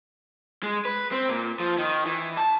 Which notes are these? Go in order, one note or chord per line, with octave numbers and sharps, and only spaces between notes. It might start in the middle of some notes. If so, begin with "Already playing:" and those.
G#3
B4
C4
A#2
F3
D#3
E3
A5